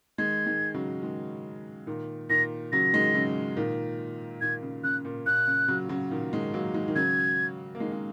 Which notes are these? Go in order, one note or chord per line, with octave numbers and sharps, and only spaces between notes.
D#3 G#3 G#6
D#3 G#3
C#3 F#3
D#3 G#3
A#2 D#3
A#2 D#3 A#6
C#3 F#3 A#6
D#3 G#3
C#3 F#3
A#2 D#3
A#2 D#3 G#6
C#3
C#3 F#6
A#2
A#2 F#6
C#3
C#3 F#3
C#3 F#3
A#2 D#3
D#3 G#3
F#3 A#3
D#3 G#3
D#3
C#3 F#3 G#6
A#3
D#3 G#3
G#3